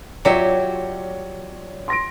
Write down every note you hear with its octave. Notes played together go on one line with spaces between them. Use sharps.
F#3 F4 G4 C#5 D5 E5
C6 A#6 D7